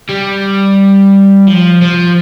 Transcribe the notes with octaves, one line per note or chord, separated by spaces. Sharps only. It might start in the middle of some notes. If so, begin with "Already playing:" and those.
G3
F3
F3